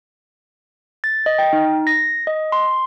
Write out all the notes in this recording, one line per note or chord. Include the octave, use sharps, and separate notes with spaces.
A6
D#5
G5
D#4
A#6
D#5
C6